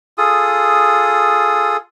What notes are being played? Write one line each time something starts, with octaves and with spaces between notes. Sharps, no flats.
F4 G#4 A4 D#6